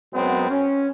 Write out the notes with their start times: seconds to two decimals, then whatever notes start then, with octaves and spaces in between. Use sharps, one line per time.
0.14 F#2 F#3 G#3 B3 C4
0.49 C#4